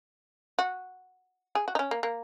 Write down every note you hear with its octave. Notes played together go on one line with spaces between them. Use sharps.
F#4
G#4
F#4
D#4
C#4
A#3
A#3